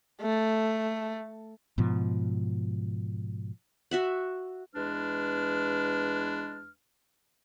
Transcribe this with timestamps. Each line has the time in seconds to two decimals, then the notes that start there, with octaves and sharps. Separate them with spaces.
0.21 A3
1.78 G#2 B2 F3
3.91 F#4 E5 F#5
4.74 E2 G#3 D4 B4 F6